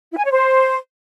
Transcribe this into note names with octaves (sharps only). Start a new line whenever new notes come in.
E4
G#5
C#5
C5